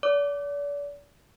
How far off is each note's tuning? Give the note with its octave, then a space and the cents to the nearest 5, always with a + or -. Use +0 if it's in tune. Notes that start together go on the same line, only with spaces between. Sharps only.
D5 -40 D6 -10